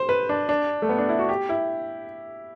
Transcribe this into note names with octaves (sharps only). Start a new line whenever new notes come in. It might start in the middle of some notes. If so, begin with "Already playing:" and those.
Already playing: C5
B4
D4
D4
A3
B3
D4
E4
F#4
G4
E4